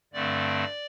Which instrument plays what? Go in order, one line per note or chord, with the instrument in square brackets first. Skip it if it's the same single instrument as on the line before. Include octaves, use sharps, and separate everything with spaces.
[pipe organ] G2 D3 A3 C4 D5